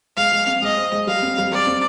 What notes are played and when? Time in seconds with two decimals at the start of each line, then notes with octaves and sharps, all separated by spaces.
0.17 G#3 F5
0.32 G#3
0.47 C4
0.62 G#3 D#5
0.77 C5
0.92 G#3
1.07 G3 F5
1.22 C4
1.38 G3
1.52 G3 D5
1.67 C4